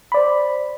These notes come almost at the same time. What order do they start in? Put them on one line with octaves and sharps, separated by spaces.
B5 D5 C5